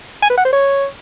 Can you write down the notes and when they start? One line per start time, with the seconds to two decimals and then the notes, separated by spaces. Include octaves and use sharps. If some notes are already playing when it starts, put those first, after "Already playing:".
0.22 G#5
0.30 B4
0.38 F#5
0.45 C5
0.53 C#5